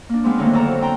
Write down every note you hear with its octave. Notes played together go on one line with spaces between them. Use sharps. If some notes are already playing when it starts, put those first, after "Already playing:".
A#3 D4
F3 G#3 B3 C4
A2 D3 D#3 F#3 A3 A#3
F2 F3 A4 A#5
F#3
C4 G5 A#5